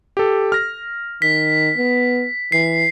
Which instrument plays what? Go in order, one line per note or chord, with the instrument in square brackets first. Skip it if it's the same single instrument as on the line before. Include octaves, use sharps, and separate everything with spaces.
[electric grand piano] G4 A4
F6 A#6
[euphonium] D#3 [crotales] B6
[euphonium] B3
[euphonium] E3 [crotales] C7